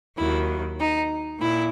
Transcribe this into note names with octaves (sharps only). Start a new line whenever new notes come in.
D#2 D#3 F#3 E4
D#4
A#2 E4